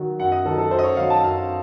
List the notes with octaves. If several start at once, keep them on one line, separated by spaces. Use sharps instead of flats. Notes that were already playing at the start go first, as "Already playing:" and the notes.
Already playing: D#3 F#3
F#2 F#5
D#5
D#3 F#3 A4
A4
F#2 C5
D#5
C#5
D#3 F#3 F5
A5
F#2 F5